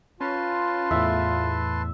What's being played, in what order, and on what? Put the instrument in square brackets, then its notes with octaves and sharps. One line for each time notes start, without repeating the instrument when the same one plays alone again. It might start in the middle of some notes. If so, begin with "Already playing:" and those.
[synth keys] C#4 [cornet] F4 [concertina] B4 A5 C6
[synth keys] E2 A2 [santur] E5